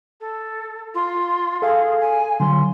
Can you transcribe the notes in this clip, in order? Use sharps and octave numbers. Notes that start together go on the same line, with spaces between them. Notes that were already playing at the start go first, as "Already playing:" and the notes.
A4
F4
G#4 A4 F5
G#5
D3 F#3 C6